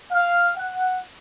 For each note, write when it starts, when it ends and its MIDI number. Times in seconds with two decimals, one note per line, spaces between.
0.12 0.50 77
0.57 1.00 78